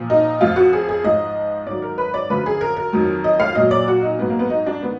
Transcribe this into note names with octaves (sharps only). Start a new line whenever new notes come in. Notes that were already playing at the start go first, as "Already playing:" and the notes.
Already playing: A#2 F3
D#4
F2 F3 F4
F#4
G#4
G#4
G#2 F3 D#5
G#2 D#3 F#3 D5
A#4
B4
D5
F#2 D3 F3 B4
G#4
A#4
A#4
F2 D#3 F#3
D#5
F5
A#2 F#3 D#5
D5
F#4
D#4
G#2 F#3 B3
A#3
B3
D#4
D4
D#3 B3